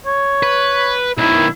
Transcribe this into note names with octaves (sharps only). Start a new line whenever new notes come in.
C#5
B4
B1 D#3 E4